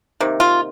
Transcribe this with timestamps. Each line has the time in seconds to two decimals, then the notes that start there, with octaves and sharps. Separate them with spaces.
0.20 C3 D#3 A#3
0.40 F4